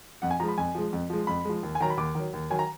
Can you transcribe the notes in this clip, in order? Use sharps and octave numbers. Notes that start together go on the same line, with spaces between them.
F2 F#5
G#5
F3 G#3 A#5
B5
F2 G#5
F3 G#3
F2
F3 G#3
F2 B5
F3 G#3
D#2
G#5
D#3 F#3 A#5
B5
D#2 D6
D#3 F#3
D#2
D#3 F#3 G#5
A#5